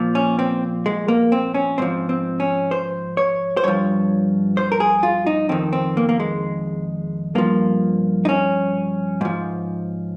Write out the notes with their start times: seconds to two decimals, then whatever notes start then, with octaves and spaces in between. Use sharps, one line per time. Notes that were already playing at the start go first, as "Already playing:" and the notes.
Already playing: A#2 F3
0.15 C#4
0.39 C4
0.86 G#3
1.08 A#3
1.32 C4
1.54 C#4
1.78 G#2 F3 C4
2.09 C4
2.40 C#4
2.71 C5
3.17 C#5
3.57 C5
3.64 G2 F3 C#5
4.57 C5
4.72 A#4
4.80 G#4
5.03 F4
5.26 D#4
5.49 F2 D#3 C4
5.73 C4
5.97 A#3
6.09 A#3
6.20 G#3
7.35 G2 F3 A#3
8.25 D#4
8.29 C#4
9.21 G#2 F3